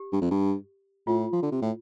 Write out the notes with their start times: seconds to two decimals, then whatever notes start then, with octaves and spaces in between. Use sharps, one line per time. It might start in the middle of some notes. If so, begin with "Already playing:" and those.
Already playing: G4
0.12 G2
0.22 F2
0.31 G2
1.07 A2 F4
1.33 F3
1.43 D3
1.52 C3
1.62 A2